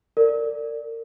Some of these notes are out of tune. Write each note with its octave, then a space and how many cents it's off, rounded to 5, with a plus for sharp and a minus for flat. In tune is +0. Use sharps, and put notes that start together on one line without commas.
A#4 -30 D5 +0